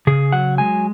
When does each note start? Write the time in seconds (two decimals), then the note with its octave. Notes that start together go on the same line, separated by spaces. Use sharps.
0.07 C#3 G#4
0.32 F#3 F#5
0.58 G#3 G#5